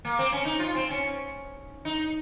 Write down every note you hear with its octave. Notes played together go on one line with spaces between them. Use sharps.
A#3
C4
C#4
D#4
F4
C4
C#4
D#4